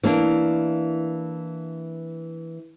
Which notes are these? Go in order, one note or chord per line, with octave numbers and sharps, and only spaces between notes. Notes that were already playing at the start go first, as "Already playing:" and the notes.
E3 A#3 D4